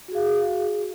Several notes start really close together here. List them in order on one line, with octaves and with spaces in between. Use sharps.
F#4 G#4 F5